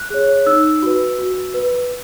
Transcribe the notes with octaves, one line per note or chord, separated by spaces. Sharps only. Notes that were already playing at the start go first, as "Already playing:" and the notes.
Already playing: F#6
G#4 C#5
D#4 E6
F#4 B4
F#4
B4